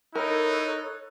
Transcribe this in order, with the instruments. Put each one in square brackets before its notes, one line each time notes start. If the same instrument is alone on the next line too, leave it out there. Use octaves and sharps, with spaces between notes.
[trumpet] D#4 [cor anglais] E4 [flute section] A4 C#5 F#6 [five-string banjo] A#4